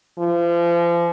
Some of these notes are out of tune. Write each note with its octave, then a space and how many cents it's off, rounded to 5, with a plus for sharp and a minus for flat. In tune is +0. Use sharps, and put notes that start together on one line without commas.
F3 -35